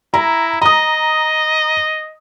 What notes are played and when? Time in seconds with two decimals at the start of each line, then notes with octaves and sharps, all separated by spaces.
0.14 E4 A#5
0.62 D#5 A#5 D#6